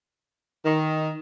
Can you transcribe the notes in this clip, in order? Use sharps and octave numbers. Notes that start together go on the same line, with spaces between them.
D#3